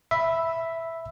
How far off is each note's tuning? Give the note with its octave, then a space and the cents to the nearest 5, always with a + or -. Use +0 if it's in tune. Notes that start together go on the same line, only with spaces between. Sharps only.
E5 +0 B5 +0